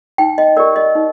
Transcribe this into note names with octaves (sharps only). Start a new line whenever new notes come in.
D#4 G5
D#5
G4 A#4 D5
D#5
D#4